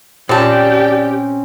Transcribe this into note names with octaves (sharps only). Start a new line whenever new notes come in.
A#2 C4 C#4 F4 G4 D5 A5